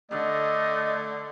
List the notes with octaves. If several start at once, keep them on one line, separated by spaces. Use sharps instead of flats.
D3 A3 D#5